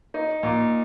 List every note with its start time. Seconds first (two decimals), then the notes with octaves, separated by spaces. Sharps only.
0.14 D#4
0.43 A#2